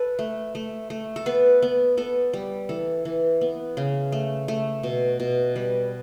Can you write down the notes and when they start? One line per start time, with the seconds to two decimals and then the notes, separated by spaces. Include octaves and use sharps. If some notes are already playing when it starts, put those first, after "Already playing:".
Already playing: A4 B4
0.19 A3
0.55 A3
0.90 A3
1.16 A4
1.26 B3 B4
1.62 B3
1.97 B3 A4
2.33 G3
2.69 E3 A4
3.05 E3
3.41 B3
3.77 C#3
4.12 A3
4.48 A3
4.83 B2
5.20 B2
5.56 G3 B4